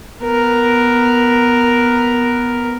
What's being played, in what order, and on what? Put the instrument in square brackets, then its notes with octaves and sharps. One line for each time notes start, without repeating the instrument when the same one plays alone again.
[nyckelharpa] B3 A#4